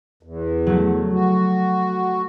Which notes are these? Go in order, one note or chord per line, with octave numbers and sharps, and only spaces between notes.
E2
F#3 A3
F#4